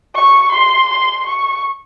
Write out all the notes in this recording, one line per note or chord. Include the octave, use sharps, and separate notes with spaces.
C#6
C6
C6
C#6